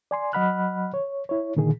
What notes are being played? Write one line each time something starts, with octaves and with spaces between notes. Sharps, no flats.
D5 G#5 C6
F#3 D#5 F#5 B5 F6 F#6
C#5
E4 C#5
A#2 D3 D#3 G#4